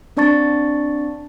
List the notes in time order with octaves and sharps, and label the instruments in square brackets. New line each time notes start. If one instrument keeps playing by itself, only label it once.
[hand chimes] C4 D4 D5 A5 C#6 A6